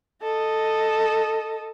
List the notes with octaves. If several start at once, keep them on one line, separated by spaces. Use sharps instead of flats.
A4 D#5